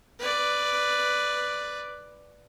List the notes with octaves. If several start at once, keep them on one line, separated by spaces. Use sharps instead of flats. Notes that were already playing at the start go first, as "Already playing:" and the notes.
B4 D5